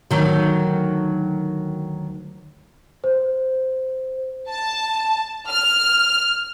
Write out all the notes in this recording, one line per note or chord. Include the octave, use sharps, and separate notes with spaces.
D2 D#3 F#3
C5
A5
F6